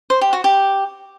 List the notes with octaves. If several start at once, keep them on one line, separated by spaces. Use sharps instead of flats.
C5
G4
F#4
G4